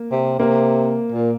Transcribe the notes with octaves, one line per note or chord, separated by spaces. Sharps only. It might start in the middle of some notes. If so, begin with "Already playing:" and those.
Already playing: A#3
C3
C3 A#3
A#2